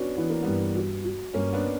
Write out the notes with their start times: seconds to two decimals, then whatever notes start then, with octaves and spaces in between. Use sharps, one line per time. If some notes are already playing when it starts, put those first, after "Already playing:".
Already playing: B3 C#4 D4 F#4
0.17 E3 B3
0.30 A#3
0.42 G2 G3 B3
0.75 F#4
1.04 F#4
1.34 G2 A#3 C#4
1.53 B3 D4